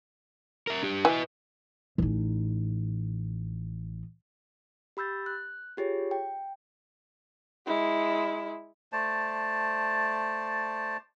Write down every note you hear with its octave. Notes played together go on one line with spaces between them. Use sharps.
A#4 E5
D4 G4
E3 B4 D#5
A1 D#4
G4 B5 E6 G6 A6
F#6
F4 G4 G#4 C#5
G5
G#3 E4
A3 C5 D5 A5